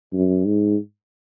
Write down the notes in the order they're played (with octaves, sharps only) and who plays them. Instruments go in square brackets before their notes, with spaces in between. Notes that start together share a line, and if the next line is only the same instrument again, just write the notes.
[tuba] F#2
G#2